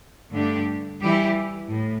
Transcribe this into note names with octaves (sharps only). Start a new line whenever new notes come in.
G2 D3 A3 D4 G4
E3 G3 E4 G4
A2